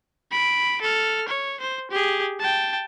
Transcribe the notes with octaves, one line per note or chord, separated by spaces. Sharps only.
B5 D7
A4 F6
C#5
C5
G4 G#4
G5 A5